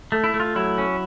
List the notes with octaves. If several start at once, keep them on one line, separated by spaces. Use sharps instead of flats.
A3
E4
A3
F4
F#3 E4
C#4